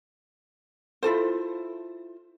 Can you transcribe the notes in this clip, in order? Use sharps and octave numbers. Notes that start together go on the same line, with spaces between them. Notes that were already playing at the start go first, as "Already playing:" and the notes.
E4 F4 A4 C5